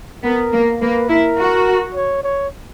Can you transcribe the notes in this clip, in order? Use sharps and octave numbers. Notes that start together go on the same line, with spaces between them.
B3 A#4
A#3
A#3 B4
E4 A#4
F#4
C#5
C#5